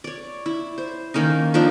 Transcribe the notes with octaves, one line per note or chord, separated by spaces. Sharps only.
C#5 D5
E4
C5
D#3 A#3 C#4 D#4
F3 A#3 D4 D#4